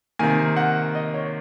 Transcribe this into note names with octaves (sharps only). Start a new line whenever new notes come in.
C3 D#3 A#3 G#5
F#5
D#5
C#5